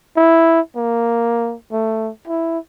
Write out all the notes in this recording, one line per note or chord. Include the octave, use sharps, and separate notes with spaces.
E4
A#3
A3
E4